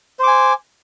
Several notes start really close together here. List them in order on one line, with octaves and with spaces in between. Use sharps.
C5 D6 G#5